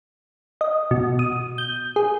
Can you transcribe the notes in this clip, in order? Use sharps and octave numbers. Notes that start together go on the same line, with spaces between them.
D#5
B2
D#6
G6
G#4